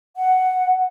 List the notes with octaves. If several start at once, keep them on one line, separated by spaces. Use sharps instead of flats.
F#5